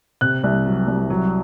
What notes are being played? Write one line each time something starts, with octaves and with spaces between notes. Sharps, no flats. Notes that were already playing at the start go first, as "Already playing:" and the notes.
C3 F#6
C2
F#3
C2
F#3